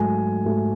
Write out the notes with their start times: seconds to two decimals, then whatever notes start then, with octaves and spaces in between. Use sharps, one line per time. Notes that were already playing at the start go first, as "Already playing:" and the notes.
Already playing: G#2 F#3 A3 G#5
0.45 G#2 F#3 A3